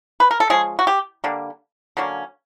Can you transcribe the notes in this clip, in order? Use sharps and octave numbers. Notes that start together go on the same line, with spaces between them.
B4
A#4
A4
F3 G#3 C#4 G#4
F#4
G4
D3 G3 A#3
D3 F#3 A#3 C#4